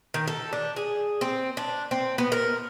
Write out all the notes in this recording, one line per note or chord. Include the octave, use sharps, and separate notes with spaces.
D#3
A4
D4
G#4
C4
D4
C4
B3
A#4